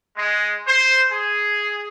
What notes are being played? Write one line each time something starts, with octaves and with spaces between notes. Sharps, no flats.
G#3
C5
G#4